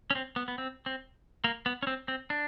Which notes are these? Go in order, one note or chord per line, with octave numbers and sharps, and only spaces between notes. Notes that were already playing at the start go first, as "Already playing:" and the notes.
C#4
C4
B3
B3
C4
C4
A#3
B3
C#4
C4
C4
D4